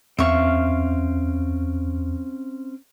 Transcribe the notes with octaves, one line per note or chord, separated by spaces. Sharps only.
E2 C4 C#4 E5 F5 C#6